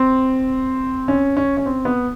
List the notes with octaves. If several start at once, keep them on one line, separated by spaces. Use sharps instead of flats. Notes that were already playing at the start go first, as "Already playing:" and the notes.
Already playing: C4
C#4
C#4
C#4
C4
B3